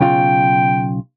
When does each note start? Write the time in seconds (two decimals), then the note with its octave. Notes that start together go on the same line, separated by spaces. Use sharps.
0.01 B1 C#3 F4 G5